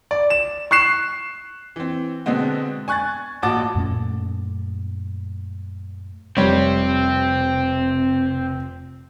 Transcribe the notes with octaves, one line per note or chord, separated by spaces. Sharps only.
D5
E7
C#6 F#6 C7 E7
E3 C4
B2 D3 G#3 B3 C4
G#5 C#6 F#6 G#6 A6
A1 A#2 F#4 A5 D6 A6
F#2 A#2 A3 C#4
F1 C3 G3 C4 C#5